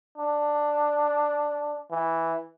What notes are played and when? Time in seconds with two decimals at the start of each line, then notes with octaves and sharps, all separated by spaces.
0.18 D4
1.91 E3